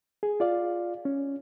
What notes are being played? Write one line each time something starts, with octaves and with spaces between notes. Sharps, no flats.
G#4
F4 D5 F5
C#4